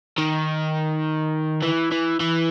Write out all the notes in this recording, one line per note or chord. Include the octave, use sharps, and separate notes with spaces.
D#3
E3
E3
E3